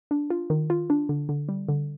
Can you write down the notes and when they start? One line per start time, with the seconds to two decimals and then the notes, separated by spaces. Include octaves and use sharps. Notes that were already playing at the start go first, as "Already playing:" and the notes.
0.11 D4
0.30 F4
0.50 D#3
0.70 F4
0.90 D4
1.09 D3
1.29 D3
1.49 G3
1.69 D3